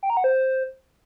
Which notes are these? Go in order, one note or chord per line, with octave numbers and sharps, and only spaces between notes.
G5
A#5
F#5
C5